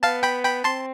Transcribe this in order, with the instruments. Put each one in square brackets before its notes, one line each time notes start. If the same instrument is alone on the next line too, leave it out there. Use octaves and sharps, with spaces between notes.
[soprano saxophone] B3 [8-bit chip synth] F5 A5
[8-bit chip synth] G5 B5
G5 B5
[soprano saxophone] C4 [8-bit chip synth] A5 C6